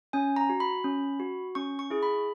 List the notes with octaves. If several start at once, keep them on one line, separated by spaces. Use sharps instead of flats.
C#4 G#5
A#5
F#4
B5
C#4
F#4
C#4 C#6
C#6
E4 G#4
B5